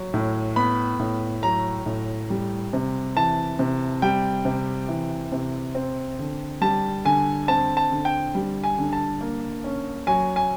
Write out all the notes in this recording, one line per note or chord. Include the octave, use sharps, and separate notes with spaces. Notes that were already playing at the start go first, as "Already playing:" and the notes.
Already playing: F#3
A2
B3 B5
A2
F#3 A#5
A2
G3
C3
E3 A5
C3
G3 G5
C3
E3
C3
C4
D3
G3 A5
D3 G#5
C4 A5
A5
D3
G5
G3
G#5
D3
A5
A#3
C#4
F#3 G#5
G#5